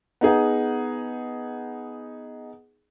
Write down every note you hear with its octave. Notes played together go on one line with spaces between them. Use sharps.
B3 D#4 G#4 F#5